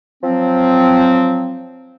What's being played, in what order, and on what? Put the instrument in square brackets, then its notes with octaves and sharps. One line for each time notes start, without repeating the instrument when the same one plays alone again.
[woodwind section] F3 F#3 C4